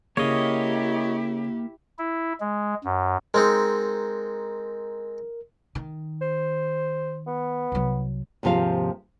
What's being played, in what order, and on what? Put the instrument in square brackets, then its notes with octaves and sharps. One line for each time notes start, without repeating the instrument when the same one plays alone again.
[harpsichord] C#3 [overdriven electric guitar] A#3 [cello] E4 G4 [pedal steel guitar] C#5 D#5
[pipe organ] E4
G#3
F#2
[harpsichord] G#3 C4 D#4 [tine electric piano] A#4
[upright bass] D#3
[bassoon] C5
B3
[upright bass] C2 F#3
[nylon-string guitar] D#2 G#2 C3 F3 F5